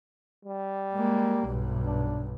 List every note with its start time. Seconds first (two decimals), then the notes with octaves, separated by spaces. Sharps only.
0.45 G3
0.94 G#3 A#3
1.45 B1 G2
1.86 D4